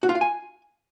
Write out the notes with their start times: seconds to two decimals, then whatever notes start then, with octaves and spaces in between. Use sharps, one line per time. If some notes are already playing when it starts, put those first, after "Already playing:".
0.03 F#4
0.09 F4
0.15 F5
0.21 G#5